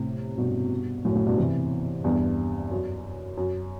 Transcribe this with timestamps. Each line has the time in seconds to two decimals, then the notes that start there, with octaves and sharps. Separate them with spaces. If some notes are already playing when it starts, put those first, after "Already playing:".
Already playing: A2 C3
0.38 G2 B2
1.05 F#2 A2
1.15 F#2 A2
1.26 G2 B2
1.38 C3 E3
2.04 E2 G2
2.71 F#2
3.37 F#2